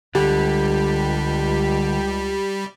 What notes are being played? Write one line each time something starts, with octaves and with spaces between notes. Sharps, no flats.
C#2 D3 G3 G4